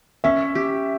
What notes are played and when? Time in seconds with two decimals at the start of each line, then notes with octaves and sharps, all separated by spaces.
0.24 C#4 E5
0.55 G4